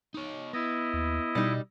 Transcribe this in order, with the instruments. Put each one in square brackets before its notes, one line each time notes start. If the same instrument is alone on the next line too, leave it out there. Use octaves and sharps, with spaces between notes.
[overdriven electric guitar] D#4 C#5
[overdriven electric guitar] B3 [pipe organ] E4 D#5
[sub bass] D#2
[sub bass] B2 [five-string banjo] G3 D#4